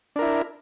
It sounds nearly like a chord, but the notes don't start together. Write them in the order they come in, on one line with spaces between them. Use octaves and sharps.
D4 A#4 E4